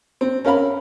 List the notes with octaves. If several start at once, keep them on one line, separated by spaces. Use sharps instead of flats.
C4
C#4 A#4 F5 B5